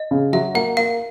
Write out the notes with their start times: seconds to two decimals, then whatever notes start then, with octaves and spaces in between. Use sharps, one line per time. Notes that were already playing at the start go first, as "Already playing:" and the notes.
Already playing: D#5
0.11 C#3
0.33 F#3 E5
0.55 A#3 F#5
0.77 A#3 F5